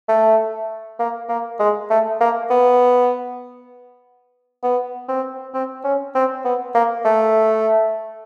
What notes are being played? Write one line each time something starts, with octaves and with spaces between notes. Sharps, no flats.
A3
A#3
A#3
G#3
A3
A#3
B3
B3
C4
C4
C#4
C4
B3
A#3
A3